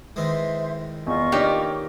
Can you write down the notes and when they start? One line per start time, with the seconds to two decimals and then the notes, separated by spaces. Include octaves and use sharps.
0.16 D#3 E3 G#3 C5 E5
1.06 E2 F4 D#5 C#6
1.32 A#3 D4 D#4 G4 C#5 D5